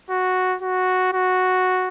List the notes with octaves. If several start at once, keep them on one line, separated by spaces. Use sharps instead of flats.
F#4
F#4
F#4